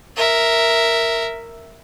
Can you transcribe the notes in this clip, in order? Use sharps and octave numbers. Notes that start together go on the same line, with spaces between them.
A#4 E5